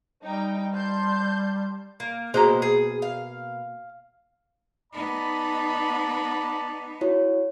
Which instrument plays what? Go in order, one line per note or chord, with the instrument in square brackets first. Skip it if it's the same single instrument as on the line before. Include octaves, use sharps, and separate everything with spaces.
[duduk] G3 [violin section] D#4 G5
[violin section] A5 C6 G6
[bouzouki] A#3
[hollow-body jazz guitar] B2 A#3 A#5 [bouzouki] G#3 C5
[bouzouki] G#4
F5
[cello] B3 D#4 [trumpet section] D5 A5 B5
[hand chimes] E4 F#4 C#5